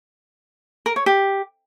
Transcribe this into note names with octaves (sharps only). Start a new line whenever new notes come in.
A#4
C#5
G4